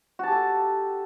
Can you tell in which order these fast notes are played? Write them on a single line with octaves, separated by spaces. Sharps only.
F#4 A5 G4 A4